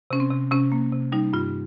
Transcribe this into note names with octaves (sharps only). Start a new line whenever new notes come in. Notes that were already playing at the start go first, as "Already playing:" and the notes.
C3 C#4
C4
C3
C3 C#4
A#3
C3
G3 D#4
G2 F4